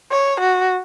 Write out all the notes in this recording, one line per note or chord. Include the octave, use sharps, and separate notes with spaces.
C#5
F#4